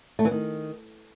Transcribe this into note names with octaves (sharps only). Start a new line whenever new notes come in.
A3
E3
D#3